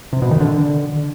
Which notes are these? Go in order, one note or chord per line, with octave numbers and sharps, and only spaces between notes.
C3
B2
D#3
D3